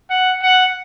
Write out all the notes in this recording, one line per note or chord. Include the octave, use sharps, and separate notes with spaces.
F#5
F#5